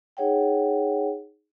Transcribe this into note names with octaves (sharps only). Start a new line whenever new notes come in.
D#4 G#4 C#5 F#5 G5